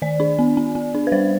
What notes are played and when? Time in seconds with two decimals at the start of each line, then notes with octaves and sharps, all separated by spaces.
0.02 D#3 D5
0.20 D4
0.39 B3
0.57 B3
0.75 B3
0.95 D4
1.07 B4
1.12 G3 C5